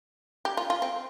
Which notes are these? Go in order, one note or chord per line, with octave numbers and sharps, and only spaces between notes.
G4
F4
F4
C4